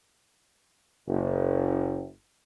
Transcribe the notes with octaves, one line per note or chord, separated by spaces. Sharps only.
F#1